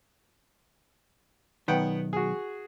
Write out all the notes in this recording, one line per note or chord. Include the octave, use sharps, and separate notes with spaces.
B1 D#3 B3 F#5 G5
F#4 G#4